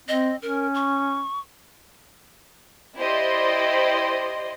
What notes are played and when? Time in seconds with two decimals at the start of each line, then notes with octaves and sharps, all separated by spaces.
0.08 C4 D#5
0.42 C#4 A#4
0.74 C#6
2.96 E4 G4 C5 D5 D#5 C6